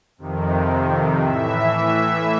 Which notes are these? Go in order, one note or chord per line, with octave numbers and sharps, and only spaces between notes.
F2 C3 D#3
A2 E3 E5
E5